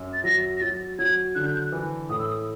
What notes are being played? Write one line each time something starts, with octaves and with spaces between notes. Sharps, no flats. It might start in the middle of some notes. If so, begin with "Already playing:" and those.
Already playing: F#2
A6
F#3 A#6
A#6
F#3 A6
F#3 G#6
D3 F#6
G6
F#6
E3
A2 D#6
E6
D#6